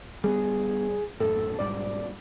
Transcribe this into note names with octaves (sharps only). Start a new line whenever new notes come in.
G3 A3 B3 G#4
D#1 F#2 A2 A4
B1 G#2 G3 D5